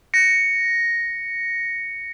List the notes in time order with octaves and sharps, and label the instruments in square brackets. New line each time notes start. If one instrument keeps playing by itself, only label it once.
[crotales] A#6 C#7